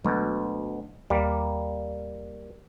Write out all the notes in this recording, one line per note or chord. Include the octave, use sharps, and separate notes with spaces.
D2 B2 F#3 G#3
D#2 G3 A#3